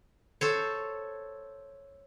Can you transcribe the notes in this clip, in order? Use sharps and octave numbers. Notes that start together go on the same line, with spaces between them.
A4 C5 C#5